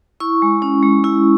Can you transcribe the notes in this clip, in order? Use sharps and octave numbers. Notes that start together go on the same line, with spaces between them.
E4 C#6
G#3
C#4
G#3
E4